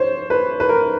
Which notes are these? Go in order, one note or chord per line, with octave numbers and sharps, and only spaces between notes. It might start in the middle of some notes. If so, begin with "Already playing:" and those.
Already playing: C5 C#5
B4
B4
A#4